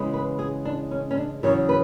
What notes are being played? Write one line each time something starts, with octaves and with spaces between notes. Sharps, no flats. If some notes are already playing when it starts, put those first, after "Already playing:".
Already playing: C#3 E3 G#3 B3
B4
G#4
D4
C#4
C#4
D4
E2 C#3 F#3 C#5
B4